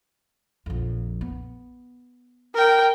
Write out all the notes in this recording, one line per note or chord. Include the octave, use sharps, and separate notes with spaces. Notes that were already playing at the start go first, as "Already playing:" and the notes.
A#1 F2
B3
A#4 G5